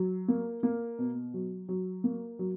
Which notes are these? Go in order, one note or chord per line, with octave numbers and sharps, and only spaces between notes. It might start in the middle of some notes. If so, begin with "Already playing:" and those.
Already playing: F#3
A#3
A#3
B2
F#3
F#3
A#3
F#3